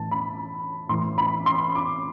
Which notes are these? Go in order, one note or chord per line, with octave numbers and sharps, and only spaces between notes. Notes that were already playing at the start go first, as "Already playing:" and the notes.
Already playing: A2 E3 A5
B5
A2 E3 C6
B5
C6
D6